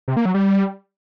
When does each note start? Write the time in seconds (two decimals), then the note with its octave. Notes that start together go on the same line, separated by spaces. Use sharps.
0.08 C3
0.17 A#3
0.25 F#3
0.34 G3